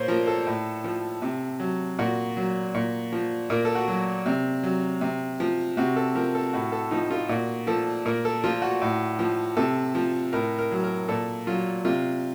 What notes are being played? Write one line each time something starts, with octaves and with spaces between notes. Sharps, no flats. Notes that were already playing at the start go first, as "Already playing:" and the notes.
Already playing: A#2 C5 C#5
F3 A#4
A4
A2
F3
C3
F#3
A#2 F#4
F#3
A#2
F3
A#2 A#4
A4
F#4
F#3
C3
F#3
C3
F3
C3 F#4
A4
F3 A#4
A4
A2 F#4
A4
F3 D#4
F4
A#2 F#4
F3 A4
A#2 A#4
A4
F3 F4
F#4
A2
F3
C3 A4
F3
A2 A#4
A#4
F#3
A#4
A#2 A4
F#3 F4
C3 F4